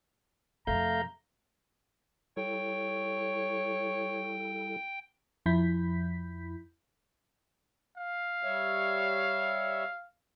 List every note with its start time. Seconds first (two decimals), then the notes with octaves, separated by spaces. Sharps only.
0.67 F2 C3 A3 F5 A#5 G6
2.37 G3 E4 A4 C#5 G5
5.46 F2 F3 E4 B5 G6 B6
7.97 F5
8.43 G3 C#5 E5